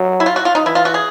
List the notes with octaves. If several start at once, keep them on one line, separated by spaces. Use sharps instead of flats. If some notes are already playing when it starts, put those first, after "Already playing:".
Already playing: F#3
E4
F4
F#4
F4
D#4
E3 E4
F4
F#4
G#4